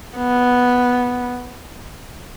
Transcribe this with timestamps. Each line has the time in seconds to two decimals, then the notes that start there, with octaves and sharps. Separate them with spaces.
0.17 B3